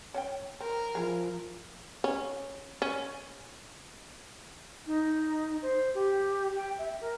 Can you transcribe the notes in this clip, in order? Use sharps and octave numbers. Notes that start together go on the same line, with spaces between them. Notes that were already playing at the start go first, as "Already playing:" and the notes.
C#4 F#5 G5
C4 A#4
F3 E4 G#4
C#4
C#4
D#4
C5
G4
G5
E5
A#4